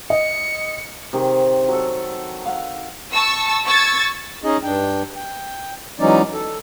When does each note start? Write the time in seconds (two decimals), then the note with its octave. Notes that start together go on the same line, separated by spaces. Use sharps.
0.10 D#5 C#7
1.13 C3 D#3 G#4
1.68 F#3 A4
2.45 F5 F#5
3.13 A5 C#6 E6
3.66 C#6 E6 G#6 A6
4.44 C#4 D#4 G#4 D#5
4.63 G2 D4 G5
5.16 G5
6.00 E3 F#3 G#3 C#4 D#4 D5
6.33 A4